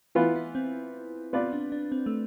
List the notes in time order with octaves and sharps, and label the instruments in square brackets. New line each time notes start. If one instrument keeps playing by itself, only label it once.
[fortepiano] E3 B3 F4 B4 [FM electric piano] E4
[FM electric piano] E4
C4
[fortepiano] B3 F4 B4 D5 [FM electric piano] C4
[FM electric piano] D4
D4
C4
A3